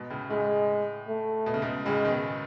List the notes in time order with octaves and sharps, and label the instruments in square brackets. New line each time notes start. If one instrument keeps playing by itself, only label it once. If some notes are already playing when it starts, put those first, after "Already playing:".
Already playing: [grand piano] G#2 B2
A2 C#3
[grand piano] A2 [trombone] G#3
[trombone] A3
[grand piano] B2
C#3
G#2 B2
[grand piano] A2 C#3 [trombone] G#3
[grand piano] B2 D#3